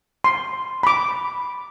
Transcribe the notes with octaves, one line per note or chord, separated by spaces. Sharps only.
C6
B5 D6